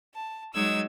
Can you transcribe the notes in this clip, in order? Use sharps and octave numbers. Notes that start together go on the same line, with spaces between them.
A5
F#3 G#3 D#4 E6 G#6